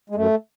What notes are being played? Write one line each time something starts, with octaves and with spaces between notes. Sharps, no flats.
G#3
F#2 A3